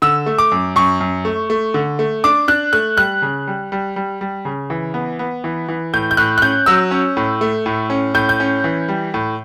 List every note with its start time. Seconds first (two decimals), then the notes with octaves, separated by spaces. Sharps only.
0.02 D3 E6
0.26 A3
0.39 D6
0.52 F#2
0.76 F#2 C#6
1.01 F#2
1.25 A3
1.50 A3
1.74 D3
1.99 A3
2.24 D4 D6
2.48 D4 F#6
2.73 A3 F#6
2.97 G3 F#6
3.22 C#3
3.47 G3
3.72 G3
3.96 G3
4.21 G3
4.45 C#3
4.70 E3
4.94 B3
5.19 B3
5.44 E3
5.68 E3
5.93 A2 G6
6.11 G6
6.17 A2 F#6
6.38 F#6
6.42 C#4 G6
6.66 F#3 E6
6.91 C#4
7.17 A2
7.41 A3
7.66 A2
7.90 C#4
8.14 A2 G6
8.29 G6
8.40 C#4
8.64 E3
8.88 G3
9.14 A2